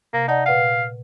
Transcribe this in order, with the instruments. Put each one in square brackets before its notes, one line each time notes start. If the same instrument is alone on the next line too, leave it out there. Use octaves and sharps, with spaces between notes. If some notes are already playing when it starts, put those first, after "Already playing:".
[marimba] C3 [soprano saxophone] A#3
[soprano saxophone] D#4 [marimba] D5 F#5 A5
[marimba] A#2 B4 F#5 [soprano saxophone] F5